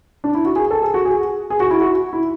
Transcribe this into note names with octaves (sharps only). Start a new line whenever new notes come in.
D4
E4
F#4
G#4
A4
G#4
F#4
G#4
G#4
F#4
E4
F#4
E4